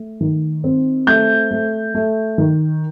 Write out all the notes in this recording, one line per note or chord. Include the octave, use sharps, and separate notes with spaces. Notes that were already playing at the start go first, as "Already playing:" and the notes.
Already playing: A3
D#3
C4
A3 G6
A3
A3
D#3